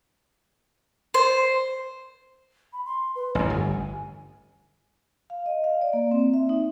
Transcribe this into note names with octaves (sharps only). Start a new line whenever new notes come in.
C5
B5
C6
B4
A1 F2 G#5
G1
F5
D#5
F5
D5
A#3
C4
E5
D#4